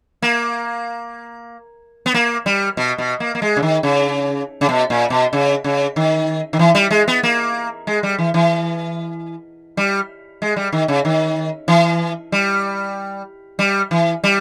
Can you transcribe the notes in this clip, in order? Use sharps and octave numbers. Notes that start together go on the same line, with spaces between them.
A#3
B3
A#3
G3
B2
B2
A#3
A#3
G#3
C#3
D#3
C#3
C#3
B2
A#2
B2
C#3
C#3
D#3
D#3
E3
G3
G#3
B3
A#3
G#3
G3
E3
E3
G3
G#3
G3
D#3
C#3
D#3
E3
G3
G3
E3
G3